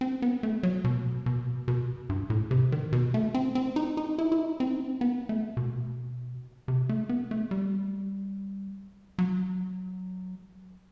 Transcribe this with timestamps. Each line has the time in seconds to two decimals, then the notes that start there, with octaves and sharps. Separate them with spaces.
0.01 C4
0.22 B3
0.43 A3
0.63 F#3
0.84 B2
1.26 B2
1.68 B2
2.09 G2
2.30 A2
2.51 C3
2.72 D#3
2.93 B2
3.14 A3
3.34 C4
3.55 C4
3.76 D#4
3.97 D#4
4.18 E4
4.32 E4
4.38 D#4
4.60 C4
4.76 D#4
4.80 C4
5.01 B3
5.29 A3
5.57 B2
6.68 C3
6.89 A3
7.09 B3
7.31 A3
7.51 G3
9.19 F#3